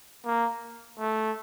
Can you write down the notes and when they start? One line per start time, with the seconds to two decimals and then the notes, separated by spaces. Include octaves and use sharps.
0.26 A#3
0.99 A3